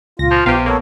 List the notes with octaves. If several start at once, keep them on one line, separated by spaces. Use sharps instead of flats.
C#2 A#2 F4 A#6
F3
A#1 C3 B3 G4 F5 F6
B2 A#3 A4 C#5